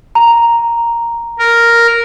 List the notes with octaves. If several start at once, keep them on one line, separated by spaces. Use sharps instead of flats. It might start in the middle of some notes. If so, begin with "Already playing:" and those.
A#5
A#4